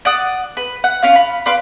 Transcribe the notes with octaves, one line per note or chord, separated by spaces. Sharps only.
D5 F#5 D#6
B4
F#5
C#4 F4 F5
B5
B4 D5 F5 C6